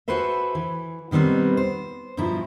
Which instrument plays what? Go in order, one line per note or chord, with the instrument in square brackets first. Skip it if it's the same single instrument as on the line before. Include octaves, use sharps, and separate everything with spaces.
[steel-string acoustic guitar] F#4 G#4 A4 B4 C5 E5
E3
B2 D#3 G3 B3 C4
C5
G2 B2 F3 E4 A#5